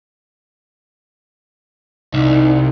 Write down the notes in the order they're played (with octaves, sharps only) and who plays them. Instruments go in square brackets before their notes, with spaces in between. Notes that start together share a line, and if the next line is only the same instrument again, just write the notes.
[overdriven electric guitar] C2 [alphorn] D#4